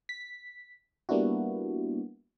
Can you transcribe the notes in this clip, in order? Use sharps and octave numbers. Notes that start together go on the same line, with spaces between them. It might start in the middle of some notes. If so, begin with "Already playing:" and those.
B6
G3 A#3 B3 D4 E4 F#4